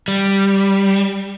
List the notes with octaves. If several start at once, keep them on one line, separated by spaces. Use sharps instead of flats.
G3